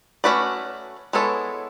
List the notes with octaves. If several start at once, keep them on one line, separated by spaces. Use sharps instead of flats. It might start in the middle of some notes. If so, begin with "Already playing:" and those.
A3 C#4 F#4 B4 D5
G#3 B3 E4 A4 C#5